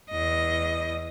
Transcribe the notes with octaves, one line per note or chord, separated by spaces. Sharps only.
E2 D#5